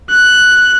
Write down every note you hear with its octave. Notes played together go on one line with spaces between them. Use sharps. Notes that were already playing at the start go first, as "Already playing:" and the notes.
F#6